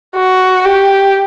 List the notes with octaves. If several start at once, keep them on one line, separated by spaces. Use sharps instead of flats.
F#4
G4